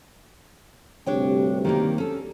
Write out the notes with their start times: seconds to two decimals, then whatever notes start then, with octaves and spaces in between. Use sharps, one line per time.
1.06 D2 G2 C3 D4 C#5 G5
1.65 D#3 G3 A#3
1.98 C#4 A4